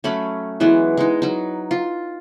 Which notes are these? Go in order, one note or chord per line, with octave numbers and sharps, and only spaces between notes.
F#3 A3 C#4 B5
E3 F#3 G#3 B3
G#3 D#4
F#3 D#4
F4